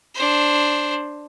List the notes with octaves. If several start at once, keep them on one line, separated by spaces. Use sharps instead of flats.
D4 C5